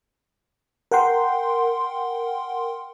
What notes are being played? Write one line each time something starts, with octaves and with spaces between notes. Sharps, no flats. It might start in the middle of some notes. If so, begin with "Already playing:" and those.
A#4 F#5 G5 C6